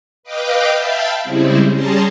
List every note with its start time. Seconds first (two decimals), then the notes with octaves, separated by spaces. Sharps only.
0.23 B4 D#5 F5 G5 D6
0.75 E5 F5 G5 A5 B5
1.23 C#3 G3 G#3 C4 E4
1.73 G3 C#4 G#4 A5 A#5 C6